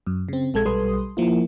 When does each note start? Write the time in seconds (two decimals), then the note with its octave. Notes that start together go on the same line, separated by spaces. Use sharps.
0.07 F#2
0.29 C#3 C4
0.54 A#1 G#3 A4 G#6
0.65 B1 G3 A4 B4 C6 D#6
1.17 F3 A#3 E4